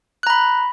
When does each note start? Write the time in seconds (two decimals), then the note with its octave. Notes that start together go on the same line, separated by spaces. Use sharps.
0.23 F#6
0.27 A#5
0.30 B5